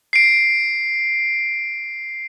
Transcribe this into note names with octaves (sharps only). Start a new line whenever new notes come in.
C7 D7